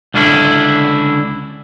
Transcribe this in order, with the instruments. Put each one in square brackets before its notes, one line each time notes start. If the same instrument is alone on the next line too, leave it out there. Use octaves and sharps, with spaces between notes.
[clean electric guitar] C#2 D3 C#4 D4 E4